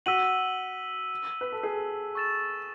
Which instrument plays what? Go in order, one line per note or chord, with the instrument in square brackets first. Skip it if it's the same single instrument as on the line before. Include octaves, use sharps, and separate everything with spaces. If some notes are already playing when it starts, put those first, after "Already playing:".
[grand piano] F#4 [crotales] E6 B6 D#7 F#7
[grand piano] B4
A4
G#4
[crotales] C#6 E6 A6 E7